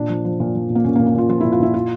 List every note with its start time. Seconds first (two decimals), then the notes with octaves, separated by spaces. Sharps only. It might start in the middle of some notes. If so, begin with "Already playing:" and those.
Already playing: A#2 D4
0.09 F3
0.25 F3
0.40 A#2
0.55 F3
0.70 A#2
0.75 A#3
0.84 A#2 C#4
0.95 A#3
0.99 A#2
1.06 A#3
1.14 A#2 F4
1.29 F3 F4
1.40 A#2 E4
1.52 F4
1.60 A#2 E4
1.74 F4